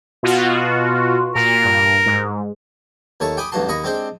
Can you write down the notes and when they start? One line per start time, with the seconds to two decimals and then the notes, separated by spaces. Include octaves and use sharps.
0.23 B2 F4 F#4
1.35 A#2 A#4
1.65 G2
2.06 G#2
3.20 D#2 A3 C#5 A5 C#6
3.37 G4 G5 G#5 B5 D6 D#6
3.51 A1 E2 G2 F#4 A5 C6
3.68 D#2 D#5 A#5 B5 C#6
3.84 G#3 C4 D4 G4 C5 G5